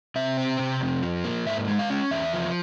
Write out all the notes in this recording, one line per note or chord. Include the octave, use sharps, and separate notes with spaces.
C3 E5
C4
C3
F2
F3
A#3
G#2 E5
G#3
F5
C#4
E2 E5
F3